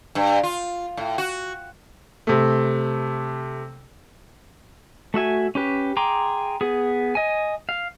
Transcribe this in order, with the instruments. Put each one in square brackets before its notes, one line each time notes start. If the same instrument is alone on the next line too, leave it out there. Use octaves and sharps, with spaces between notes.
[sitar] G2
F4
A2
F#4
[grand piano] C3 A3
[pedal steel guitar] A3 F#4 E5 G#5
C#4 G4 B4
G#4 G5 A#5 C6 D6
B3 G#4
D#5 G#5
F5